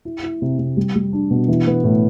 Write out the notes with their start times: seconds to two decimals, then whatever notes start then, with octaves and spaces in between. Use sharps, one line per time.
0.05 E4
0.23 E4
0.42 C3
0.59 C3
0.77 G3
0.95 G3
1.13 D4
1.31 B2
1.48 E3
1.67 B3
1.84 A2